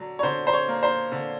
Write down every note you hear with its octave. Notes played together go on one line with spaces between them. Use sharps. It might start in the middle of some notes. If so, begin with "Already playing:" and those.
Already playing: D3 F#3
C#5
D3 C5
C5
C#5
A#3
C5
D3